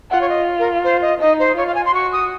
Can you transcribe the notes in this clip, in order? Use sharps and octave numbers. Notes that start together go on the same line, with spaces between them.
F4 F#5
C#5
D#5
A#4
C5
D#5
D#4 D#5
C5
F4 C#5
F5
G#5
C6
F#4 C#6
D#6